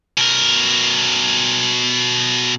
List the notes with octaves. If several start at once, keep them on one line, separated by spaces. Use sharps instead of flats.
B2 A#4